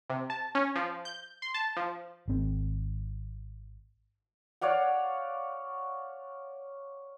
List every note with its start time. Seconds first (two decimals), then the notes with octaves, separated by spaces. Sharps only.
0.10 C3
0.30 A5
0.55 C#4
0.76 F3
1.05 G6
1.42 C6
1.54 A5
1.77 F3
2.28 G#1 C4
4.61 C#5 D5 F5 F#5